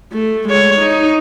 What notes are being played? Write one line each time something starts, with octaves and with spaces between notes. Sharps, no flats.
A3
G#3 C#5
D#4